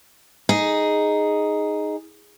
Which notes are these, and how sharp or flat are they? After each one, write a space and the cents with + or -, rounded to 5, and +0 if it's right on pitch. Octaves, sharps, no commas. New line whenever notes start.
D#4 +0 G#4 +0